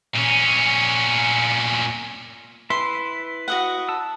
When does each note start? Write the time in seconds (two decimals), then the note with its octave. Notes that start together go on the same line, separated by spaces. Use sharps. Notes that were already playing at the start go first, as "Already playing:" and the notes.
0.16 A#2 C#4
2.70 E4 B4 E5 C6
3.48 F#4 D#5 F#5
3.89 A5 E6